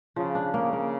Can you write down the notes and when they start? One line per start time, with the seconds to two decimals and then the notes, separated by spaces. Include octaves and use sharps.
0.16 C#3 F3
0.35 D4
0.54 C#3 A#3
0.73 A#3